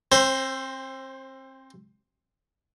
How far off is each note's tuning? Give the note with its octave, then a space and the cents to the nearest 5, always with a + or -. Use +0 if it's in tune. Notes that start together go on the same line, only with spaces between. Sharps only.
C4 +30 C5 +0